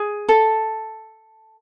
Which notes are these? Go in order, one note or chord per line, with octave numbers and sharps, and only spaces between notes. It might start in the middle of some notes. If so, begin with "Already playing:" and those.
Already playing: G#4
A4